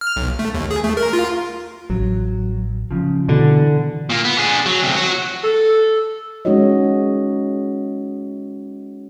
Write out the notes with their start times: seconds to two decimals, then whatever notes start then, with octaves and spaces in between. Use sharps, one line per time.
0.01 F6
0.16 B1
0.39 A3
0.54 D#2
0.71 G#4
0.84 A3
0.97 A#4
1.13 F4
1.90 A1 F#3
2.91 C#3 F3
3.29 B2 D3 E3
4.10 A#2 A#3
4.24 B3
4.38 D4 G#4
4.66 F#3
4.83 D2 C3
4.96 F#4 C#5
5.44 A4
6.45 G#3 C#4 D#4 F#4 C#5 D#5